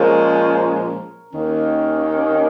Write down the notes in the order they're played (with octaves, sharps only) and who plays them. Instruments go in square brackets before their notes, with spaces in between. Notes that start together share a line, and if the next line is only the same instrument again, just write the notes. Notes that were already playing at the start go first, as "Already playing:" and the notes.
Already playing: [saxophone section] A#2 F3 G#3 C#4 [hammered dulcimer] A#4 C#5
[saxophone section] D#2 D#3 A#3 C#4